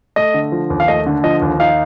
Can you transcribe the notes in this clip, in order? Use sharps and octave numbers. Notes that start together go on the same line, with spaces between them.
A3 D#5
D3
F3
D#2
F5
A3 D#5
D3
F3 D#5
D#2
D#4 F5